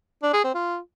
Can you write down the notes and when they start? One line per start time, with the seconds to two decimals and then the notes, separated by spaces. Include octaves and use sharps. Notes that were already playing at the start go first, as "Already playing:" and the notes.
0.23 D4
0.33 G#4
0.44 C4
0.55 F4